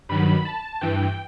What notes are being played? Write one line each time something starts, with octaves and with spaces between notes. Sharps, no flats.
G2 D#3 F#3 B5
A5
G2 E3 G5